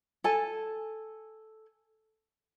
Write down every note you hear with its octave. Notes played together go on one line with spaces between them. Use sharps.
A4 G#5 A5